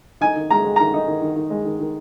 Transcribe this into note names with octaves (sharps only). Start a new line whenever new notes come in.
D#4 G#5
D#3
G#3 A#5
G#3
D#3 A#5
D#4
D#3
D#3
D#3
G#3
D#3
D#3